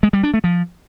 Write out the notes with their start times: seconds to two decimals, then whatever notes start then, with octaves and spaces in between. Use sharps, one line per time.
0.03 G#3
0.13 G3
0.23 D4
0.34 A3
0.44 F3